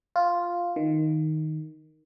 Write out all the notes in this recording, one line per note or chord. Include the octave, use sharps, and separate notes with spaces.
F4
D#3